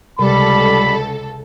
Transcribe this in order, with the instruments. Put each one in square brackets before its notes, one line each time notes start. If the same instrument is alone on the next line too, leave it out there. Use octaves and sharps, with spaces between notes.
[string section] C#2 A4 [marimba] C3 [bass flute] G3 [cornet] B5